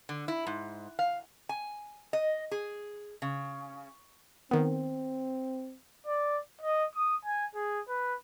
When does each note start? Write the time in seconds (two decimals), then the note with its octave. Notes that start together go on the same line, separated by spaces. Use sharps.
0.09 D3
0.28 E4
0.47 G#2
0.99 F5
1.49 G#5
2.13 D#5
2.51 G#4
3.22 C#3
4.51 D#3 B3 C4
6.06 D5
6.61 D#5
6.94 D#6
7.25 G#5
7.54 G#4
7.88 B4